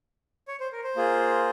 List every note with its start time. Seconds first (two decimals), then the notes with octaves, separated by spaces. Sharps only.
0.48 C#5
0.60 C5
0.72 A#4
0.84 C5
0.96 A#3 F4 G#4